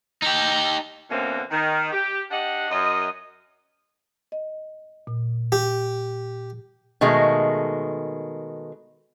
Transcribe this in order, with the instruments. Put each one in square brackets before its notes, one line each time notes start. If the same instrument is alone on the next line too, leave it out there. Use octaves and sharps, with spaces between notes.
[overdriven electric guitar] D#4 G4
[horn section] B2 D3 E3 A#3 C4 C#4
D#3
G4
D4 G4 D#5 F#5
F#2 D#5
[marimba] D#5
A#2
[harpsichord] G4
[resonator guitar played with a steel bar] B2 D#3 G#3 A3